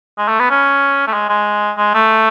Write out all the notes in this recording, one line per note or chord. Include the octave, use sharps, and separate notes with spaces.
G#3
A3
B3
C#4
A3
G#3
G#3
G#3
A3